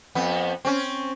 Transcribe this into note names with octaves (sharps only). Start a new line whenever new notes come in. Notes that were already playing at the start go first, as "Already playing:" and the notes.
F2 B3
C4 C#4